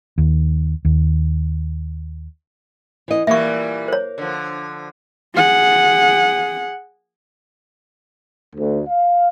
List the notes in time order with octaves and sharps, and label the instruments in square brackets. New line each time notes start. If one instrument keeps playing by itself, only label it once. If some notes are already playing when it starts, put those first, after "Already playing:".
[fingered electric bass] D#2
D#2
[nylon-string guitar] E3 D#5
[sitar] A#2 E3 G3 [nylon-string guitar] A#3 [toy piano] E5 C#6
[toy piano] C5 C#5
[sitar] D3 F3
[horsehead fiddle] G#4 F#5
[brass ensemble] D2
F5